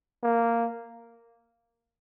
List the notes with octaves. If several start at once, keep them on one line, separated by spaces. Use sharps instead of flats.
A#3